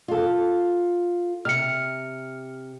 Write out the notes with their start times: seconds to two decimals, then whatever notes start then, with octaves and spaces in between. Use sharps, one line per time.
0.08 F4 A4
1.45 C3 F6 C#7